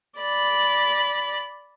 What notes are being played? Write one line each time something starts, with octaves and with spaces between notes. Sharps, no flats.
D5 B5